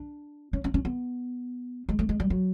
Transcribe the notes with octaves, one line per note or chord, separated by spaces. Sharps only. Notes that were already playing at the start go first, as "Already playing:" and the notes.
Already playing: D4
C#4
C#4
C#4
B3
G#3
A3
G#3
G3
F#3